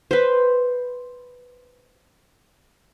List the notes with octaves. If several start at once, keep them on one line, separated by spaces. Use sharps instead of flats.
B4 C5